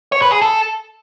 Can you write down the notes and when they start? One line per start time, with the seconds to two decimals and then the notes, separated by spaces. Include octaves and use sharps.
0.12 C#5
0.22 B4
0.32 G#4
0.41 A4